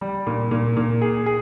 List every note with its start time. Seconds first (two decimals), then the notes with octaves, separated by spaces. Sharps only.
0.01 G3
0.26 A#2
0.51 A#2
0.76 A#2
1.01 G#4
1.26 G#4